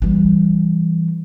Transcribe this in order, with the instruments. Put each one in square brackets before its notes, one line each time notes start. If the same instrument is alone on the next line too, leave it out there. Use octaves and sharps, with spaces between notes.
[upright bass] E3 G3